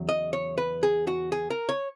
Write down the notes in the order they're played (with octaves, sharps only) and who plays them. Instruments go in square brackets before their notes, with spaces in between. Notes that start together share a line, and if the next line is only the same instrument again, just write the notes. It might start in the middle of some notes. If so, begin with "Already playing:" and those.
Already playing: [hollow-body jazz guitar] E2 C#3 F#3
D#5
C#5
B4
G#4
F#4
G#4
A#4
C#5